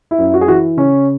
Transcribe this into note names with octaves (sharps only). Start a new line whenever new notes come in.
E4
F#2
F#4
G#4
E3 F#4
C#3 C#4